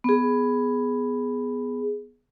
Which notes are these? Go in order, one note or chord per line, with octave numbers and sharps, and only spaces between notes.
B3 G#4